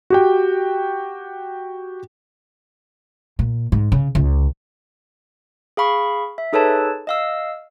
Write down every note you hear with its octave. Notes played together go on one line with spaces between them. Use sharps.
F#4 G4 G5
A#2
G#2
C#3
C#2
G#4 F5 B5 C#6
E5
D#4 G#4 A4 B4 C#5 A5
D#5 F5 E6